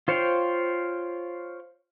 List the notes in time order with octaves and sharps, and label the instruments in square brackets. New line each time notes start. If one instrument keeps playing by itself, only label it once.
[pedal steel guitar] F4 C5 C#5 F5 G5